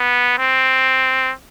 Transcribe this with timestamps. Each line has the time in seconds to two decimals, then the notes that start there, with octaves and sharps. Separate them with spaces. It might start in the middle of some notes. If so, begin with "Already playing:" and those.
Already playing: B3
0.39 C4